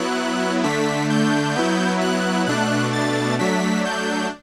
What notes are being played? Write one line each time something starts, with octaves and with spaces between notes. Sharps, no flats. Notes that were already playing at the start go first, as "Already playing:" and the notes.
Already playing: F#3 B3 E4 F#6
D3 A3 D4 B6
G6
F#3 B3 E4
F#6
B2 A3 D4 F#6
A6
F#3 A3 D4 B6
G6